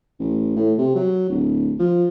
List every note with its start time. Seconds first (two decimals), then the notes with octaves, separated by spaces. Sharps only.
0.20 A1
0.56 A2
0.78 C3
0.95 F#3
1.30 D1
1.79 F3